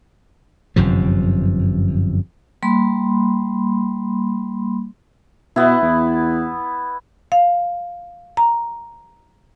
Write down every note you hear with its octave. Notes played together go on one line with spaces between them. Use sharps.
G1 F#2 C3 F3
G3 A#3 B5 C6
B2 B3 E4
E2
F5
A#5